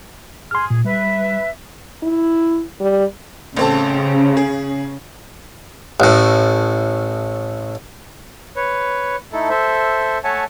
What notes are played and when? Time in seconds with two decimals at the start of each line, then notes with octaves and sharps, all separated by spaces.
0.51 G#4 C6 F6
0.70 A#2
0.85 G3 B4 E5
2.03 E4
2.80 G3
3.57 A1 C#3 C4 A4
4.37 G#4
6.00 A1 A2
8.56 B4 C#5
9.33 A3 D#4 E4 A4
9.50 A4 C5 E5
10.24 A3 C#5 E5 F#5 G#5 A5